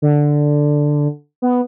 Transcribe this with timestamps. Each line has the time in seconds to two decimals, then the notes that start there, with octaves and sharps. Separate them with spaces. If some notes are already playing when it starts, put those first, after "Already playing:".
0.02 D3
1.42 B3